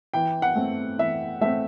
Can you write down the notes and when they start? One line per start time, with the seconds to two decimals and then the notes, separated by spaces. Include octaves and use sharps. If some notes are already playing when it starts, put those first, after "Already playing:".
0.14 E3 G5
0.42 F#5
0.56 A3 C4
0.98 E3 E5
1.41 A3 C4 E5